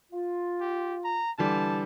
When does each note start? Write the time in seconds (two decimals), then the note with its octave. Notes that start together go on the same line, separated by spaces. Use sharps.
0.11 F4
0.61 G4
1.05 A#5
1.39 D3 E3 G3 A5